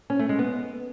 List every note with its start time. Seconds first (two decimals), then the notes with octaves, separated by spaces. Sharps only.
0.10 C#4
0.19 A3
0.29 G#3
0.39 B3